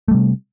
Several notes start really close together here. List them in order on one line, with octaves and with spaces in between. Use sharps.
A3 G3 C3